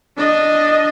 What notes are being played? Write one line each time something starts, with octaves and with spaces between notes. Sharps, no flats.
D4 D#5